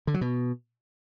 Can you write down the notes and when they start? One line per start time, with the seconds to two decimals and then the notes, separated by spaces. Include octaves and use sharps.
0.07 D3
0.14 F#3
0.21 B2